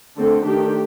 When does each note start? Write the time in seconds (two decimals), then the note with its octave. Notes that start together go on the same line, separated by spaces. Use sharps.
0.17 D3 A3 C4 A4
0.45 D#3 A3 D4 G4